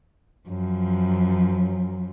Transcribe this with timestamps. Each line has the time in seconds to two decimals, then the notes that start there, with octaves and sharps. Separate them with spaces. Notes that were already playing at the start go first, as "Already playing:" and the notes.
0.48 F#2 F3